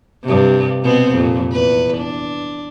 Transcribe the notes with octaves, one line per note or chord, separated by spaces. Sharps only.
G2 C3
B2 B3 C4
F2 A#2
E2 B4
D4